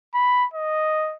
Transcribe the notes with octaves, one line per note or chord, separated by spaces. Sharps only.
B5
D#5